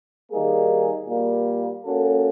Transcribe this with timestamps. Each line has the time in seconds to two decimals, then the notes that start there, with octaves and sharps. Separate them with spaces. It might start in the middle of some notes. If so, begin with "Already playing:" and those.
0.30 D#3 G3 A#3 D#4 G#4
1.08 A#2 G3 A#3
1.85 A#3 C#4 F#4 A4